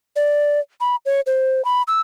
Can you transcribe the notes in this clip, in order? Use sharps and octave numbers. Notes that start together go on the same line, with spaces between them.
D5
B5
C#5
C5
B5
E6